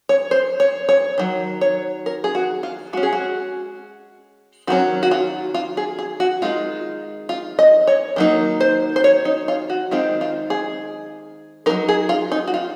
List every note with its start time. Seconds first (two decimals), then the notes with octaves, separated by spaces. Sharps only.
0.09 C#5
0.31 C5
0.60 C#5
0.89 C#5
1.18 D#3 F#3
1.61 C#5
2.06 A#4
2.24 G#4
2.35 F#4
2.63 F4
2.93 G#3 C#4 F#4
3.03 G#4
3.13 F#4
4.67 D#3 F#3 C#4 F#4
5.03 F#4
5.11 F4
5.54 F4
5.77 G#4
5.99 G#4
6.20 F#4
6.42 D#3 G#3 D#4 F4
7.29 F4
7.59 D#5
7.87 C#5
8.16 D#3 F#3 A#3 D#4
8.61 C5
8.96 C5
9.04 C#5
9.25 D#4
9.48 F4
9.70 F#4
9.91 D#3 G#3 C4 D#4 F4
10.21 F4
10.50 G#4
11.66 A#3 D#4 A#4
11.70 F#3
11.89 G#4
12.09 F4
12.32 D#4
12.48 F#4
12.54 F4